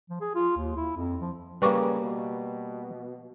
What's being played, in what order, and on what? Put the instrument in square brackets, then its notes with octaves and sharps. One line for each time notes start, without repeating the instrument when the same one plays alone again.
[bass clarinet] F3
G#4
F4
D#2
E4
F2
F3
[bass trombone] C#3 [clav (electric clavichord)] G3 A#3 [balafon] B4 C#6 D6
[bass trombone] B2